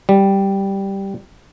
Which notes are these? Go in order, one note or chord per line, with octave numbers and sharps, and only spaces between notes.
G3